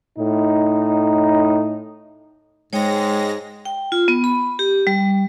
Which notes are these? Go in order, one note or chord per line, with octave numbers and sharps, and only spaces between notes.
A2 D#4
G#2 G#3 C#5 G5 A#6
G5
F4
B3
B5
G4
G3